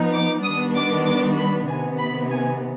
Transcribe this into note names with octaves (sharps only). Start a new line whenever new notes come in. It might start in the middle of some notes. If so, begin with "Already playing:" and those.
Already playing: F3 B3 D#4
D6
D#3 G3 B3 D4 D#6
D6
D6
B5
C3 D#3 B3 G#5
B5
G#5